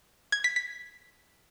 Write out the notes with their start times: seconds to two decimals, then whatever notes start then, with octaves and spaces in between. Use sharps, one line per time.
0.32 G#6
0.44 B6
0.56 B6